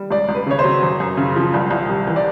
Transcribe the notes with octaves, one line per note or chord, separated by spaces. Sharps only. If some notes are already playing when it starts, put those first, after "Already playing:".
Already playing: G3
C#2 D5
C#2
B4
C#3 C#5
C5
F#3
F#2
F#2
C#3
F3
C2
C2
C3
E3
D5